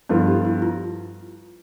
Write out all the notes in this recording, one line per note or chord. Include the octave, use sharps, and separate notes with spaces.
G2 F3 B3 E4 F4 A4
G4
E4
F4